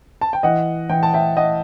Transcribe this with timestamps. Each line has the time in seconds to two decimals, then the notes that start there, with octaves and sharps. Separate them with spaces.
0.21 A5
0.33 G5
0.43 E3 D#5 F#5
0.90 E3 G5
1.03 A5
1.14 E5 G5
1.37 E3 D#5 F#5